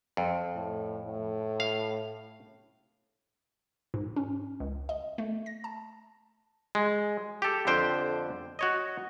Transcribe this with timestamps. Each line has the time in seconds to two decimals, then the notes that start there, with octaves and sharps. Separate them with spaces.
0.17 F2
0.55 A2
1.05 A2
1.60 F5
3.94 G#2
4.16 C#4
4.60 C#2
4.89 D#5
5.18 A3
5.46 A#6
5.64 A5
6.75 G#3
7.42 G4 A4
7.67 F2 D3 C5 G5
8.59 F#4 C#5 D#5